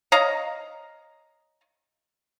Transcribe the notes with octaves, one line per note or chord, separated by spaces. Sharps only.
C#5 D#5 F5 A#5